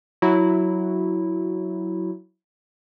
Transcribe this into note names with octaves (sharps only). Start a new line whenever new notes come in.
F#3 E4 F#4